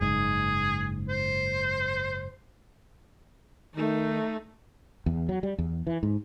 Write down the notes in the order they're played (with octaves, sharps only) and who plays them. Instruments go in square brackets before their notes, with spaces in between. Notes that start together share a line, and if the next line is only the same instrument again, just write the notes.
[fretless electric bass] F#1 G#2 [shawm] G#4
[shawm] C5
[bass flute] D#3 [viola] A3 D#4
[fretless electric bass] E2
F#3
G3
E2
E3
G#2